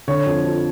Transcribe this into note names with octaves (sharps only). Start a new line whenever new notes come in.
D3 C#5
F2
F3